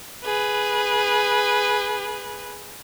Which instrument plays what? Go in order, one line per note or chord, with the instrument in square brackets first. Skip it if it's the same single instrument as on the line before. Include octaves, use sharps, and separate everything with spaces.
[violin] G#4 B4